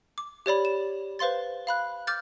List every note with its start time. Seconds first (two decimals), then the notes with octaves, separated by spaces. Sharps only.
0.18 D6
0.46 G4 C#5 D5 B5
0.65 E7
1.19 B4 C5 F5 C6 A6
1.67 F5 B5 F#6
2.07 D6 F6 G6 A6